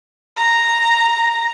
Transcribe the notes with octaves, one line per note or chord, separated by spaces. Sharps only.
A#5